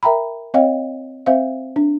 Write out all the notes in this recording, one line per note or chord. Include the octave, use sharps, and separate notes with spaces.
A#4 E5 G5 A#5 B5
C4 C#5 D#5 F5 G5
C4 C5 E5 F5
D4